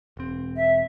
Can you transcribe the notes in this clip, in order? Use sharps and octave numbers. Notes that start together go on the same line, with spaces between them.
E1 C4
E5